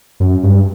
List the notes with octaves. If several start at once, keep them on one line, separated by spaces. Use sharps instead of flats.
F#2
G2